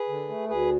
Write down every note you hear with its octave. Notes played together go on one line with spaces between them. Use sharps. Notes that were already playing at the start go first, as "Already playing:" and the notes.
Already playing: G#4 B4
D3
A3
D2 G#4 B4